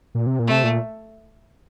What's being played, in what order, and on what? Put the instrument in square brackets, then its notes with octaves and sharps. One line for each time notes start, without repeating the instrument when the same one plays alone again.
[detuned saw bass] A#2
C3
A#2
[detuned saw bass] C3 [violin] A3
[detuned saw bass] A#2